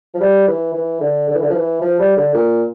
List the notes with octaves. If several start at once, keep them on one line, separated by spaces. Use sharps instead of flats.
F3
G3
E3
E3
D3
D3
E3
D3
F3
E3
F3
G3
D3
A#2